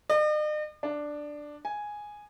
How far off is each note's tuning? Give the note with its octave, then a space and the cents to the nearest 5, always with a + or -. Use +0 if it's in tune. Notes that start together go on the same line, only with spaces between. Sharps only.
D#5 -45
D4 +5
G#5 +0